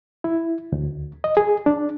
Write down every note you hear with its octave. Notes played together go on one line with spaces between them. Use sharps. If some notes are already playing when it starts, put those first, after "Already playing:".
E4
D2
D#5
G#4
D4